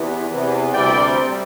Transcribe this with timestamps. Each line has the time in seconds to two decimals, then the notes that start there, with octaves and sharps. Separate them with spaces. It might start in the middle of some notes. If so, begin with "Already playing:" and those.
Already playing: E2 C3 E3
0.30 E2 C3 E3
0.73 D2 C3 G3 C4 D5 G5
1.17 C3 G3 C4